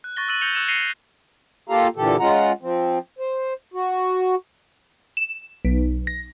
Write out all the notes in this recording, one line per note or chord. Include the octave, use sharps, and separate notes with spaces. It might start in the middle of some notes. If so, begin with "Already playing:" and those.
F#6
C#6 F#6 A6 A#6 G7
E6 F#6 A6 D#7 F#7
E6 G6 A#6 C#7 F7 G7
C#6 E6 F#6 G#6 C#7 E7
A#6 C7 C#7 D#7 F7 G7
A#3 F4 G4 A4 F5 A#5
A#2 D3 E3 G4 A4
G#3 C#4 F4 F#5 A#5
F3 C4
C5
F#4
E7
B1
A#6